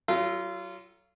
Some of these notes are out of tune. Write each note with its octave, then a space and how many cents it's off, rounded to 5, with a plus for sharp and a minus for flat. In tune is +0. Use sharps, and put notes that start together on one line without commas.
F#3 +25 F4 -25 A4 +0